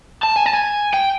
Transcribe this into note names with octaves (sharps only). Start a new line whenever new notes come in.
A5
G#5
A5
G#5
G5